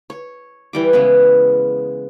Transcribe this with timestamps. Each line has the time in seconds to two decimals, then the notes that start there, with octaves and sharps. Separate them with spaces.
0.10 C#5
0.73 E3 G3 D6
0.93 C#3 G#3 B3